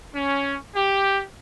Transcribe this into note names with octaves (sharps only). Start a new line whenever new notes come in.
C#4
G4